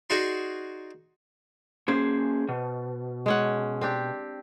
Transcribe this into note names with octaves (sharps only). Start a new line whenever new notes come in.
D#4 F#4 G#4 D5 C6
A#3 C#4 G#4 C5
B2
G#3 C#4 F#5
C4 D4 G4